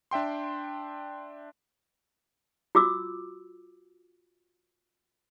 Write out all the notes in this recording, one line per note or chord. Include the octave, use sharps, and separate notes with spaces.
D4 E5 G5 C6
F4 F#4 D6 E6